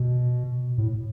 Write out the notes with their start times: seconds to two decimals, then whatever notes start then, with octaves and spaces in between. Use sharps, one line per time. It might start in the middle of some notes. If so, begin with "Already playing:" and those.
Already playing: B2
0.78 A2